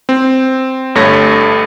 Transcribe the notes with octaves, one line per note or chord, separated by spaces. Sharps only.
C4
G1 G2 A3 C#5 A#6